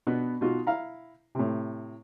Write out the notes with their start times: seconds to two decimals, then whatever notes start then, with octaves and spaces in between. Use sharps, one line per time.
0.07 B2 B3 D4
0.41 B2 D#4 F4 F#4
0.67 E4 F5 A#5
1.35 A2 C3